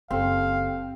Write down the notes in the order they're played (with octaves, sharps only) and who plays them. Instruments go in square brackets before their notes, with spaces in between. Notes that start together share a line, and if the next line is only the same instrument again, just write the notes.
[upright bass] F#1 [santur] C4 [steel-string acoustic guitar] G4 A4 [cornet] F5